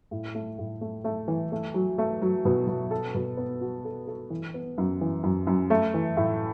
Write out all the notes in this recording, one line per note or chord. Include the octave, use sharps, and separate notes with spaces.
A2
A3
A2
A3
A3
E3
A3
F#3
A3
F#3
B2
B2
A4
B2
B3
F#4
A4
A4
E3
B3
F#2
E3
F#2
F#2
A3
E3
A2